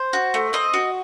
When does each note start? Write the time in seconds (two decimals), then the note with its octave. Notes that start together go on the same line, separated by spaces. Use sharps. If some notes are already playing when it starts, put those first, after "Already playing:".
Already playing: C5
0.13 F#4
0.34 A3
0.53 C4 D#5
0.74 F#4